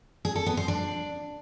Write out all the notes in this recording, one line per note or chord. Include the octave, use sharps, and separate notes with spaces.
G#4
A4
B3
C5
D4